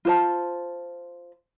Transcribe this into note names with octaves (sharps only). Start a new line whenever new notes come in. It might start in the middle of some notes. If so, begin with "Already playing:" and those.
F4 C5 A5